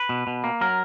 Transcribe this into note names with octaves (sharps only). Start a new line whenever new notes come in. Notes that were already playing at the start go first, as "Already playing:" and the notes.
Already playing: B4
B2
B2
A#3
F#3 A#4